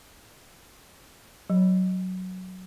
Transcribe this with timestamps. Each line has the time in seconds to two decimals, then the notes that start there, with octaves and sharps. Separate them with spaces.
1.50 F#3